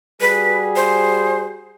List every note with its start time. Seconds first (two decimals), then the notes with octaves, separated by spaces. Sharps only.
0.21 G3 F#4 G#4 B4
0.76 C5